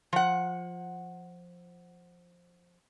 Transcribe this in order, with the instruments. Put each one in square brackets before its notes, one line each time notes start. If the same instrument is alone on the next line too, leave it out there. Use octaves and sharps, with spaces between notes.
[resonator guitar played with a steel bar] F3 F#5